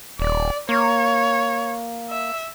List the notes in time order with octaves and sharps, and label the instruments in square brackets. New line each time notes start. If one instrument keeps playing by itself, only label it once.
[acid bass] D#1 [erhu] D5
[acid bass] A#3 [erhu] C#5
[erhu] E5